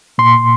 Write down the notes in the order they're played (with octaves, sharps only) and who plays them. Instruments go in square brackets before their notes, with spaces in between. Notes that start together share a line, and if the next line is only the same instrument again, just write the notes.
[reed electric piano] A#2 C6